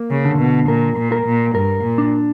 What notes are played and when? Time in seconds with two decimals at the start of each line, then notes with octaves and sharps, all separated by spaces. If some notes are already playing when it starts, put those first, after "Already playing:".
Already playing: A#3
0.11 C#3
0.25 D3
0.39 B2
0.68 A#2 A#4
0.97 A#2
1.12 A#4
1.26 A#2
1.55 G2 A#4
1.84 A#2
1.98 D4